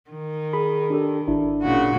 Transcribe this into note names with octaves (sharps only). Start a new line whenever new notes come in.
D#3
G#4 B5
D4 G4 A4
G#1 D4 E4
A#2 C#3 F#4